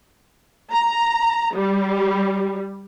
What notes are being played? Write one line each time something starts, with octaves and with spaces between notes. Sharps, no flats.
A#5
G3